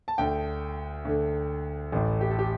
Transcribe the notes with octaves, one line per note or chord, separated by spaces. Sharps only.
A5
D2 D3 G5
D2 D3
A1 A2
G4
A4
G4